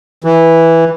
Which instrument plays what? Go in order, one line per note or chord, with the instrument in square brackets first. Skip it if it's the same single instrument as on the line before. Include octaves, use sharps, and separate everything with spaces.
[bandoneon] E3